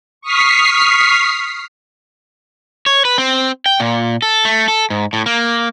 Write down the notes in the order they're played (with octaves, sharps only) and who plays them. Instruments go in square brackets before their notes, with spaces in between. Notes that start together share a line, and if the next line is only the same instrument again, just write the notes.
[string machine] C#6 D#6 F6 B6 C7
[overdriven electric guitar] C#5
B4
C4
G5
A#2
A4
A3
A4
G#2
A2
A#3